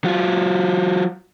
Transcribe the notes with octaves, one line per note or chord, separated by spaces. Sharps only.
F#3 F4